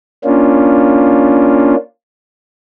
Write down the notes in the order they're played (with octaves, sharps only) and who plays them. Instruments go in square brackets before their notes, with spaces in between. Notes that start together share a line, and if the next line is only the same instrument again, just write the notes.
[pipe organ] A#3 C#4 D4 F4